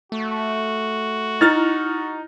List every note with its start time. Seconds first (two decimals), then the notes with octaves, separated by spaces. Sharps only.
0.12 A3 F#4
1.41 D#4 E4 F6 A6